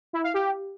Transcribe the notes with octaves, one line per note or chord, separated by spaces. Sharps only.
E4
F5
G4